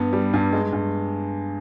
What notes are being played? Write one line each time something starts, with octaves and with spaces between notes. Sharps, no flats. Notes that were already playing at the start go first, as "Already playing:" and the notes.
Already playing: G2 B3
G3
G2
G#3
G2